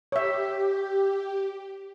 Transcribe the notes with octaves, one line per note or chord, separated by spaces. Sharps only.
G4 C#5 E5